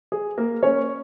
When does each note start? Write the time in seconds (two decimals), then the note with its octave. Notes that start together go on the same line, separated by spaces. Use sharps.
0.12 G#4
0.38 A#3 A#4
0.63 C#4 C#5